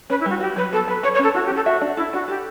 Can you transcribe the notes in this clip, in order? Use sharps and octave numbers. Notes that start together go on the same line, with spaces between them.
C#4 B4
E4
G3 F#4
F#4 G4
F#3 B4
B3 A4
F#3 B4
B4 C#5
C#5
C#4 A4
E4 F#4
G4
C#4 A4
F#4 E5
D4
E4 A4
D4 F#4
G4 A4